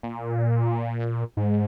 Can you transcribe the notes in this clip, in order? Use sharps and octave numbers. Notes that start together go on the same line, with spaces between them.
A#2
G#2